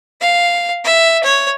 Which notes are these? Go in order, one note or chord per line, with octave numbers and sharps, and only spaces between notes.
F5
E5
C#5